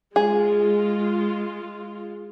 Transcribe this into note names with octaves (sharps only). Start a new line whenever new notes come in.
G#3 F4 G#4